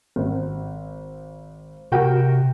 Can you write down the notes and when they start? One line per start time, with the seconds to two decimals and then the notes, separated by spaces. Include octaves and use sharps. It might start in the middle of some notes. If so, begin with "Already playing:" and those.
0.16 G#1
1.92 C3 F#4 A#4 G5